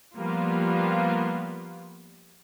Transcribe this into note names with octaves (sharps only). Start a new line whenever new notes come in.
F3 G3 A#3 B3 F4